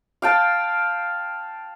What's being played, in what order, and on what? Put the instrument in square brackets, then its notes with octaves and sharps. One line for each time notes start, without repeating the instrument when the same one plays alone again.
[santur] F5 G5 A5